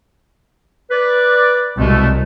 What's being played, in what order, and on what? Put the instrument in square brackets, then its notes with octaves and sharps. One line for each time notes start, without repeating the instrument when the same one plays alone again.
[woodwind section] B4 D5
[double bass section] C2 [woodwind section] B2 G#3 A3